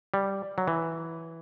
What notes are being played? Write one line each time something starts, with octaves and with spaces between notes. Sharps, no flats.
G3
F#3
E3